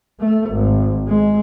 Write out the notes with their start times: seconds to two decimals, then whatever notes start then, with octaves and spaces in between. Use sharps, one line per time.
0.20 A3
0.51 G#1
1.07 G#3